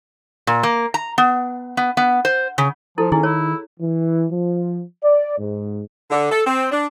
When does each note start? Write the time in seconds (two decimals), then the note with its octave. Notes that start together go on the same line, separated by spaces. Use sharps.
0.47 A#2
0.63 A#3
0.94 A#5
1.18 B3
1.77 B3
1.97 B3
2.25 C5
2.58 C#3
2.98 F3 E4 A4
3.12 D#3 C#4 E4 G#4
3.23 E4 C#5
3.80 E3
4.32 F3
5.03 D5
5.38 G#2
6.11 D3
6.31 A4
6.47 C4
6.72 D4